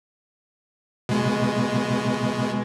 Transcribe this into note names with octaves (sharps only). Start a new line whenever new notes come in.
B2 G#3